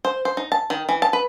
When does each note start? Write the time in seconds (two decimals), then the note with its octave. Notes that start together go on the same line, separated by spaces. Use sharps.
0.05 C5
0.25 C5
0.37 D#4
0.52 A5
0.70 D#3
0.89 E3
1.02 A5
1.13 B4